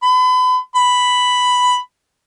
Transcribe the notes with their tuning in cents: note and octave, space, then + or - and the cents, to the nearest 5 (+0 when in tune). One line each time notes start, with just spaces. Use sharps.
B5 +35
B5 +5